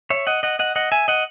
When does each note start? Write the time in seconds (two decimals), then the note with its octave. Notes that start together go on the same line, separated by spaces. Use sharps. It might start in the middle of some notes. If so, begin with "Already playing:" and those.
0.10 C#5 E5
0.27 D#5 F#5
0.43 D#5 F#5
0.59 D#5 F#5
0.76 D#5 F#5
0.92 E5 G#5
1.08 D#5 F#5